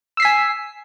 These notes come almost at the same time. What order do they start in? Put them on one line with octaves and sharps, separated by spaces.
E6 C7 B6 G#5